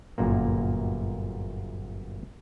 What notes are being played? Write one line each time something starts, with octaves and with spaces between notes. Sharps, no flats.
G1 F#2 A#2 A#3